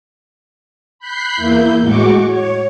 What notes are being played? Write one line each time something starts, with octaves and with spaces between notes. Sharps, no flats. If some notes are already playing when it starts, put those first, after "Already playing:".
B5 F#6 G6 B6 C7
E2 A#3 E4 G6
A2 G#3 F#4 C#6 D6
C#5